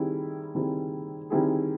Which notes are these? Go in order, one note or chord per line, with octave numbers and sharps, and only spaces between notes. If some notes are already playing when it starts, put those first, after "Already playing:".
Already playing: D#3 G3 C4 E4 G#4
D#3 G3 C4 E4 G#4
D#3 G3 C4 E4 G#4